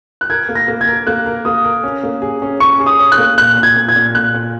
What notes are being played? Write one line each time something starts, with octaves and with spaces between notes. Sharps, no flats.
F#6
A#4 G#6
A#3
A#6
A#3
G#6
A#4
A#3 F#6
A#4
A#3 D#6
A#4
C#4
A#3
G#4
C#4
C#4 C#6
G#4
D#6
C#5
F#6
A#3
A#2 F#6
A#2
G#6
A#2
G#6
A#2
A#2 F#6
A#2